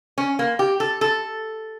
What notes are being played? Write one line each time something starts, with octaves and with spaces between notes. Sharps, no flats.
C#4
A#3
G4
A4
A4